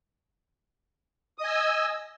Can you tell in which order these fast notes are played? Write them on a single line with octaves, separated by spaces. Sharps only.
D#6 D#5 G#5 E6